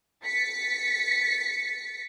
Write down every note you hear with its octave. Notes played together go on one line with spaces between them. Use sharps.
A6 B6 C#7